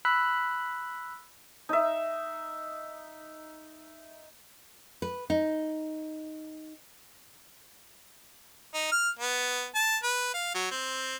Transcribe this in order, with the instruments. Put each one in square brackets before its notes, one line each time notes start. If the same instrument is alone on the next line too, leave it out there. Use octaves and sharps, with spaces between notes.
[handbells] B5 E6 F#6 B6
[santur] D#4 E5
[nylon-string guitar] B4
D#4
[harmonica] D#4
F6
B3
A5
B4
F5
F#3
C4